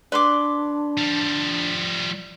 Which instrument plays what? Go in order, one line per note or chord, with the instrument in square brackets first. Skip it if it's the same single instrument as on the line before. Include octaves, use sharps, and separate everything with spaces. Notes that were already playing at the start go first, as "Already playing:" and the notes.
[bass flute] D4 [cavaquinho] B4 C6 D6 [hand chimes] D5
[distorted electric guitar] F3 G3